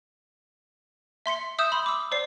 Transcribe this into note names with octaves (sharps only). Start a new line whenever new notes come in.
E5 C6 B6 C#7
E5 D#6 E6 G6 E7
B5 C6
D6 E6
C5 D5 C7